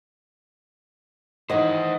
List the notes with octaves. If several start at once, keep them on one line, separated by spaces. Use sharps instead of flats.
D#3 E3 E4 C5 D#5 F#5